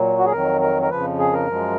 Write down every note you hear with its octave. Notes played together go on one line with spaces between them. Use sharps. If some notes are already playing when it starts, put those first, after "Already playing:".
Already playing: A#2 F#3
F#4
G#4
F2 D#3 F#3 A#4
A#4
A#4
F2 C#3 F3 B4
G#4
A#4
F#2 F3 G#3